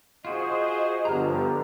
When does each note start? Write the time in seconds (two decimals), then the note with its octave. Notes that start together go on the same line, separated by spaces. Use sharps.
0.25 F4 F#4 G#4 C5 D#5
1.05 G2 D3 F3 B3 G4 A#5 F6